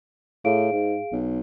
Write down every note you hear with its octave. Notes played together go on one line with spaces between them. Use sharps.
A2 G#4 F5 D7
G#2
B1